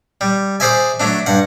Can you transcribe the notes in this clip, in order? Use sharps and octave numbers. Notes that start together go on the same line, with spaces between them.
G3
G#4 C5 D5 E5 G#5
F#3 A3 D4
G2 F#5